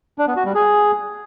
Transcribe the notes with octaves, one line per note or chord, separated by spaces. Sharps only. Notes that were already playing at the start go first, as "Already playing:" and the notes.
D4
B3
F#4
G3
G#4